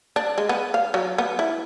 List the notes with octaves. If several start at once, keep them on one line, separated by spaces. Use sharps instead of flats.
D4
G#3
B3
F5
F#3
B3
E4